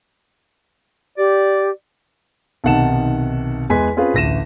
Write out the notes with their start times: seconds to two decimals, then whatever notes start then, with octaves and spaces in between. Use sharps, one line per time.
1.18 G4 D5
2.64 B1 C3 D#3 F#5 A5 E7
3.69 E2 G#3 B4 G#5 C6 B6
3.97 C4 C#4 F4 G#4 B4 F5
4.14 A1 D2 A#6 D#7 E7